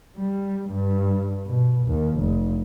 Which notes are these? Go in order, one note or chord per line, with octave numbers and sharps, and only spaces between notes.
G3
G2
B2
D#2
F1